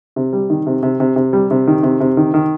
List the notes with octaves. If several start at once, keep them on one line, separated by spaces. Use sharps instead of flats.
C3
G3
D#3
C3
C3
C3
C3
G3
C3
D#3
C3
C3
D#3
D#3